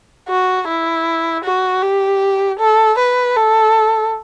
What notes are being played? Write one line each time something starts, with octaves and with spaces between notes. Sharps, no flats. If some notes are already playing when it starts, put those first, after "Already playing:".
F#4
E4
F#4
G4
A4
B4
A4